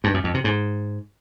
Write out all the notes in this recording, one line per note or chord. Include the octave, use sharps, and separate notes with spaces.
G2
F#2
F2
C3
G#2